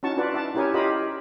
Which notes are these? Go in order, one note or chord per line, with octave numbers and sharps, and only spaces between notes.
C#4 D#4 E4 F#4 A5 C#6
D4 F4 F#4 B4 D5
E5 F#5 A5
C#4 E4 G4 A#4 C#5 G#5
F4 G4 A#4 C#5 D#5 B5